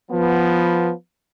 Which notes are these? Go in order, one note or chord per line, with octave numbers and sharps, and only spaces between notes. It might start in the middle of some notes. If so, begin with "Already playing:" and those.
F3 B3